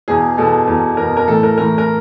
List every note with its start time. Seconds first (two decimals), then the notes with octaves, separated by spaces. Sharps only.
0.08 E2 B2 G#4
0.38 E2 B2 A4
0.67 E2 B2
0.97 E2 B2 A#4
1.17 A#4
1.27 A2 E3 A4
1.43 A#4
1.58 A2 E3 A#4
1.78 A#4